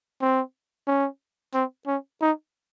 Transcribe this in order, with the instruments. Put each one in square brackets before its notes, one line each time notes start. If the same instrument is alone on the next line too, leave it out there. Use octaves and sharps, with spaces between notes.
[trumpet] C4
C#4
C4
C#4
D#4